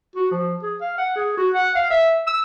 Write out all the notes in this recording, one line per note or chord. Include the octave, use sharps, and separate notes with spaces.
F#4
F3
G#4
F5
F#5
G#4
F#4
F#5
F5
E5
E6